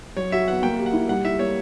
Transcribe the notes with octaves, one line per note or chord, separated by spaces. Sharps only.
F#3 C#5
F#4 E5
B3 F#5
A#3 G5
G4
F#5
E4
G3 F#5
E4 E5
A#3 C#5